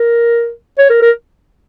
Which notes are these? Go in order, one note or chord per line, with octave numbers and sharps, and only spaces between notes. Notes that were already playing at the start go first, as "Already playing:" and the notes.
Already playing: A#4
C#5
A#4
A#4